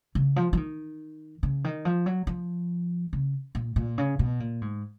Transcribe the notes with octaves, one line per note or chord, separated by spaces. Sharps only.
C#3
F3
F3
D#3
C#3
D#3
F3
F#3
F3
C#3
A#2
A#2
C#3
B2
A#2
G#2